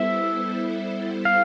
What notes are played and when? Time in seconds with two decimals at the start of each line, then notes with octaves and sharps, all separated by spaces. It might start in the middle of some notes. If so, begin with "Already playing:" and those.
Already playing: G3 B3 E4 A4 C5 E5
1.25 F5